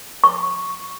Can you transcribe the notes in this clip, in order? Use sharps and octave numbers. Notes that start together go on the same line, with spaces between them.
C#6